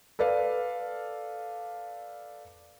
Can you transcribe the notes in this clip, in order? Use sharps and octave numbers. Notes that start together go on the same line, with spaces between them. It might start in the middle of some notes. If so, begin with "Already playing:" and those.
A4 B4 D5 F5